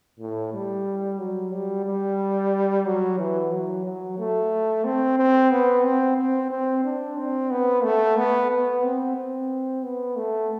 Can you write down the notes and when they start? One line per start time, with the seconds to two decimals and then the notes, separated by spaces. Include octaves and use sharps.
0.20 A2
0.54 G3
1.20 F#3
1.53 G3
1.86 G3
2.85 F#3
3.19 E3
3.52 F#3
3.85 F#3
4.19 A3
4.85 C4
5.18 C4
5.51 B3
5.84 C4
6.18 C4
6.51 C4
6.84 D4
7.18 C4
7.51 B3
7.84 A3
8.17 B3
8.50 B3
8.84 C4
9.17 C4
9.83 B3
10.16 A3